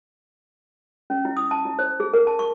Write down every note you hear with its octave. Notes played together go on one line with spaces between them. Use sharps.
C#4
E4
D#6
A5
E4
C5
G#4
A#4
A5
C#6